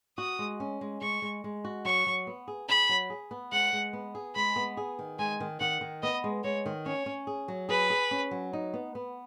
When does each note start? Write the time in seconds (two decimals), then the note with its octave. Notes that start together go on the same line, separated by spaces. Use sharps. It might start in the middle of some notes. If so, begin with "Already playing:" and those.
0.18 F#4 D#6
0.39 G#3
0.60 C#4
0.81 G#3
1.01 G#3 C#6
1.22 G#3
1.44 G#3
1.65 F#4
1.85 F#3 C#6
2.07 F#3
2.27 B3
2.48 G#4
2.69 G#4 B5
2.89 F#3
3.10 G#4
3.31 B3
3.52 G#3 F#5
3.73 G#3
3.93 B3
4.15 G#4
4.35 G#3 B5
4.56 B3
4.77 G#4
4.99 D#3
5.19 G#3 G#5
5.40 D#3
5.60 D#3 F#5
5.81 D#3
6.03 B3 D#5
6.24 G#3
6.44 G#3 C#5
6.66 D#3
6.86 C#4 C#5
7.06 C#4
7.27 G#4
7.48 F#3
7.69 G#4 B4
7.90 G#4
8.11 C#4
8.31 F#3
8.53 D#4
8.74 B3
8.95 B3